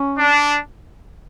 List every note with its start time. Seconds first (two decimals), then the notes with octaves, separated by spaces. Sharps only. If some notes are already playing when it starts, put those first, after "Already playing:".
Already playing: C#4
0.18 D4